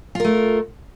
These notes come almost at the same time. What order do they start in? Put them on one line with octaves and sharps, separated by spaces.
F4 A#4 A3